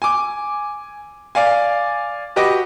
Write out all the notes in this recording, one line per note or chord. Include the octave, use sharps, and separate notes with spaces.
G#5 D6
D5 F5 G#5
F#4 G4 B4 D#5 D6